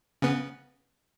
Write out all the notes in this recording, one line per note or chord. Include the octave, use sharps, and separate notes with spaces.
C#3 B3